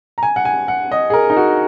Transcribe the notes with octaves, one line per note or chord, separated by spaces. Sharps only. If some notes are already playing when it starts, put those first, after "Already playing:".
A#5
G#5
F#5
G#5
F#5
D#5
G#4
A#4
D#4
F#4